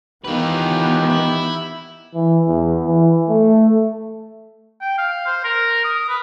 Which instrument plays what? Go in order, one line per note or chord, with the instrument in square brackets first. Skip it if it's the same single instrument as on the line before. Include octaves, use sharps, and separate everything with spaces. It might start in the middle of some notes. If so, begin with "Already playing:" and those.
[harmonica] D#3 G4 [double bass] E3 B3 [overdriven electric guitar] F4 B4
[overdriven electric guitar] E4
[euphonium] E3
E2
E3
A3
[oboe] G5
F5
C5
A#4
D#6
B4